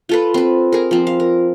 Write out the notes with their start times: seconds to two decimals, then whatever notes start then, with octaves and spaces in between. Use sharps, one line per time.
0.09 F4 A4 B4
0.34 C4 B4
0.72 G#4 A#4
0.91 F3 C4
1.07 F5
1.20 A#4